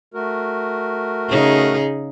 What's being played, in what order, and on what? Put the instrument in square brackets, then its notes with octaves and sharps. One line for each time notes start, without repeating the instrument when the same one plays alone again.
[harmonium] A3 F#4 A#4
[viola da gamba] C#3 D#4 G#4